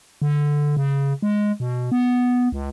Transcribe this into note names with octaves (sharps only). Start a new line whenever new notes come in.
D3
C#3
G#3
B2
B3
C#2